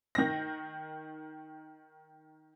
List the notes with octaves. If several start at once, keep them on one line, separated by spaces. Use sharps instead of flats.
D#3 A#6